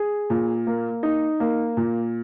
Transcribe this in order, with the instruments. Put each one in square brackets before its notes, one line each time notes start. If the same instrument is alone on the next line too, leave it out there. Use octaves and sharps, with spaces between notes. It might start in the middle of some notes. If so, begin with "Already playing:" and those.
Already playing: [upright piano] G#4
A#2
A#3
D#4
A#3
A#2